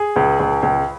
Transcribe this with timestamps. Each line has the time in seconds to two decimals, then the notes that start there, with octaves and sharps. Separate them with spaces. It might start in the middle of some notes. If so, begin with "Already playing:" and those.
Already playing: G#4
0.16 C#2
0.39 C#2
0.62 C#2